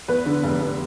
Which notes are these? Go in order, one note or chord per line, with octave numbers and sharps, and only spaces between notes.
E2 B4
D3
F1
F1